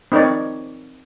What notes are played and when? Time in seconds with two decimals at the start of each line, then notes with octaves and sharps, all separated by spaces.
0.12 C4 D#4 A#4 C#5 D5